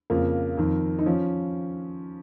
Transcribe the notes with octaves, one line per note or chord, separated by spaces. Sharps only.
F2 C#3 F3 A#3
F2 D#3
D#4
F3 C#4